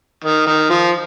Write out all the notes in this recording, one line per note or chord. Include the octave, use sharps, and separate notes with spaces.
D#3
D#3
F3